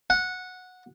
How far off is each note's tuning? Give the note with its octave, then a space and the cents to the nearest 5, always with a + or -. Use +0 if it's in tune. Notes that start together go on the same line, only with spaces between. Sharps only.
F#5 -10